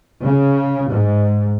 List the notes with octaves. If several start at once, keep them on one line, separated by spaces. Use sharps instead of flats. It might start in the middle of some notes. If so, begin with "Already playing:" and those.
C#3
G#2